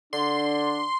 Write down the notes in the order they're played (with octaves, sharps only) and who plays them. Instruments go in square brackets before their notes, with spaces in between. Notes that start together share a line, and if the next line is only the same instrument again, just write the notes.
[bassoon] D3 [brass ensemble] D4 [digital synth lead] C6